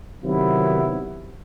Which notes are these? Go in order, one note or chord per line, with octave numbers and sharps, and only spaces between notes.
C3 D#3 F#3 B3 E4